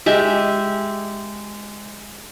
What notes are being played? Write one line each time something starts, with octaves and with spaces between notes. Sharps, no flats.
G#3 G4 E5